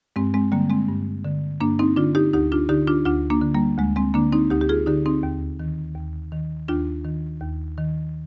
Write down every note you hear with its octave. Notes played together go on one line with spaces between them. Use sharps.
G2 G#3 C4
G#3 C4
D3 G3 A#3
G#3 C4
G2
D3
G2 A#3 D4
C4 D#4
D3 D4 F4
D#4 G4
D2 D#4 G4
D4 F4
D3 D#4 G4
D4 F4
D2 D4 F4
A#3 D4
D3
G3 A#3
D2 G#3
G#3 C4
D3 A#3 D4
C4 D#4
D2 D#4 G4
G4
F4 G#4
D3 D#4 G4
C4 D#4
D#2
D#3
D#2
D#3
D#2 D4 F4
D#3
D#2
D#3